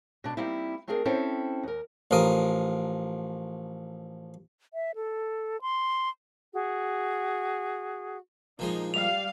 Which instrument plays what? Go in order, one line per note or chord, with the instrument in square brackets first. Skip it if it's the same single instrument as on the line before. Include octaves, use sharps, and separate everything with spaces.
[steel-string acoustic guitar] B2 D4
G3 A#3 C4 D#4 E4
A3 C4 D4 G#4 A#4
C4 C#4 E4 A4 C5 G5
D#2 A#4
[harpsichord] A1 F3 A#4 D#6
[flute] E5
A4
C6
[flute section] F#4 G#4
[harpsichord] A#2 F3 G#3 [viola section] D#4
[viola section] G3 F5 [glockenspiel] F7